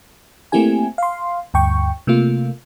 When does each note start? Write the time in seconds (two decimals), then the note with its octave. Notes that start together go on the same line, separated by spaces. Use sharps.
0.52 A3 A#3 C4 E4 G4 G#5
0.98 F5 C6
1.54 D2 G2 G5 C#6
2.07 C3 A3 A#3 F4